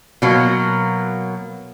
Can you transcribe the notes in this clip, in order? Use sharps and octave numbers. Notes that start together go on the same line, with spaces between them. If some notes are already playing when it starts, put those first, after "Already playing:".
B2 F#3 A#3